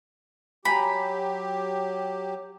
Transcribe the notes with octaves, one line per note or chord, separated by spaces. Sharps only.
F#3 G4 G5 G#5 A#5 B5